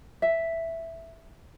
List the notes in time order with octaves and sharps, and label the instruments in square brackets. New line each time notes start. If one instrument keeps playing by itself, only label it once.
[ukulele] E5